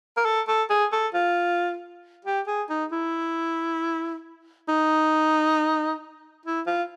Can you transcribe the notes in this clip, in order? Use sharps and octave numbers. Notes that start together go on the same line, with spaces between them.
A#4
A4
A4
G#4
A4
F4
G4
G#4
D#4
E4
D#4
E4
F4